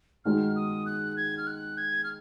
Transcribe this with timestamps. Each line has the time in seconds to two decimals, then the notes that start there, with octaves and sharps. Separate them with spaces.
0.25 D#3 G#3 D#4 F#4 F6
0.56 D#6
0.86 F#6
1.17 G#6
1.38 F6
1.47 F#6
1.78 G#6
2.04 F6